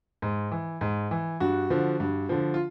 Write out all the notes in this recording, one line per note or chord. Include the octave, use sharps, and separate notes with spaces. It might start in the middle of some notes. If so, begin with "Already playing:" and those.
G#2
E3
G#2
E3
G2 F#4
D3 F3
G2
D3 F3
F4